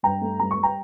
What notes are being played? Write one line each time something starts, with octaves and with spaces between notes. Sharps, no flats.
G2 G5 A#5
A3
G3 A#5
C#6
G3
G5 A#5